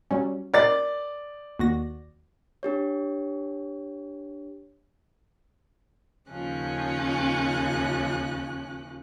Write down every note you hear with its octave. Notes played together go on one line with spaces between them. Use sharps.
F#3 G3 C#4
A#4 D5 A6
D#2 F#4 A#6
D4 G4 C#5
D#2 C#3 F3 C#4 F#6